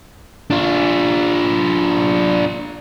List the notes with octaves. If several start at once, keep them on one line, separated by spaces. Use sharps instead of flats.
D4 F4